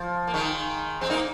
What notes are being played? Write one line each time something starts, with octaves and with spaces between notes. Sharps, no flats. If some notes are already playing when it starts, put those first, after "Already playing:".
Already playing: F3
A#3
D#3 G#3
G#3 C4
A#3 D#4